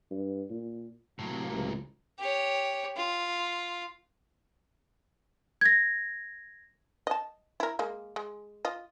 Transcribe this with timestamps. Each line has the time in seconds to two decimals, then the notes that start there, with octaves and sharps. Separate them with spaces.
0.11 G2
0.50 A#2
1.19 A2 C3 F#3 A#3
1.52 C#2
2.19 G4 C#5
2.97 F4
5.61 G#6 A#6
7.07 D#5 A5
7.60 E4 A#4
7.79 G#3 A#3
8.16 G#3
8.65 F4 D#5